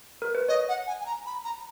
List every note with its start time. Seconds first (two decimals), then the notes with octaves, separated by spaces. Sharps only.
0.22 A#4
0.35 B4
0.48 C#5 D#5
0.69 F#5
0.87 G#5
1.01 G#5
1.06 A#5
1.26 B5
1.44 A#5